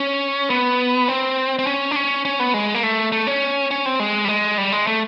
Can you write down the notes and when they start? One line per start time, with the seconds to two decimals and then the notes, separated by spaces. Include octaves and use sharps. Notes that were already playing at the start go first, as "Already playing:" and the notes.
Already playing: C#4
0.50 B3
1.08 C4
1.59 C4
1.67 C#4
1.91 D4
1.96 C#4
2.25 C#4
2.40 B3
2.54 G#3
2.74 A#3
2.83 A3
3.12 A3
3.27 C#4
3.71 C#4
3.86 C4
4.00 G#3
4.25 G3
4.28 G#3
4.58 G3
4.72 G#3
4.87 A3